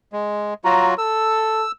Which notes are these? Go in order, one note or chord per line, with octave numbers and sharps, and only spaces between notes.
G#3
F#3 F4 F#4 A#5
A4 E6